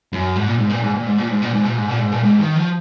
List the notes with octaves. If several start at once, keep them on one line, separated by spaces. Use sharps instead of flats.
F#2
G#2
A#2
G#2
A#2
G#2
A#2
G#2
A#2
G#2
A#2
G#2
A#2
G#2
A#2
G#2
A#2
G#2
D#3
F3